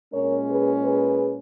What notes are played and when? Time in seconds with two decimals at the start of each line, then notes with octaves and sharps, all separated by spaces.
0.13 A#2 G#3 C#4 A#4 C#5
0.48 G#4 B4
0.83 G#4 B4